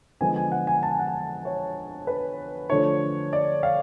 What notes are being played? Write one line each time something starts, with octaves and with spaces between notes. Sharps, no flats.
D3 F3 G#3 B3 G#5
G#5
F#5
G#5
A5
G#5
F#5
G#5
C#5
B4
D3 F3 A3 D4 C#5
D5
F5